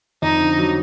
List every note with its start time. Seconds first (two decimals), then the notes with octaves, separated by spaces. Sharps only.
0.22 F2 D#4
0.41 D3
0.59 F#3